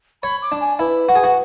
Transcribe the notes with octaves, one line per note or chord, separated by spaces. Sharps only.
C#5 B5
D6
D4
G#5
E4 B4
F#4
G#4
F#4